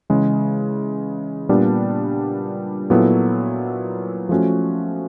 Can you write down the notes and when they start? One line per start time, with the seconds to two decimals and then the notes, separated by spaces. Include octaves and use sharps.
0.10 C#3 E3 G#3
1.49 A#2 G3 B3 D4
2.90 A#2 F#3 B3 E4 A4
4.29 F3 A3 C#4 F#4